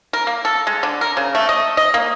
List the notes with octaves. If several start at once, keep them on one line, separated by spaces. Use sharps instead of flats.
A#4
A#3
A4
G#3
D3
A#4
C#3
A3
D#5
D#5
A#3